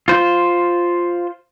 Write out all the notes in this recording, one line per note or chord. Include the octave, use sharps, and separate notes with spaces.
F4 C5